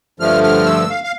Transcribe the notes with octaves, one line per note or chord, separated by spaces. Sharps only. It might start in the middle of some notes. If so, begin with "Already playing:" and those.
G2 D3 F3 A3 F6
F6
E6
F5
F5